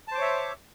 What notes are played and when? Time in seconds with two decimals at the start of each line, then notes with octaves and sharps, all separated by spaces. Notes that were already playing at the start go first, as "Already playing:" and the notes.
0.08 A5
0.11 C5
0.15 D6
0.18 C#5
0.21 E5